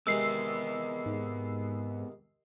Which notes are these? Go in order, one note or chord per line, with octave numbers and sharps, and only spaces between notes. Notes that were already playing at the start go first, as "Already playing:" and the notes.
C3 D#3 G#3 B3 G#4 E6 C7
G#2